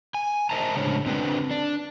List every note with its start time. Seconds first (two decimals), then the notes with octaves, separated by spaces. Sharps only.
0.14 G#5
0.50 A#4 C5 D#5 E5 A5 A#5
0.75 A2 C#3 G#3 D4 C5 C#5
1.06 D3 C4 D4 B4
1.51 D4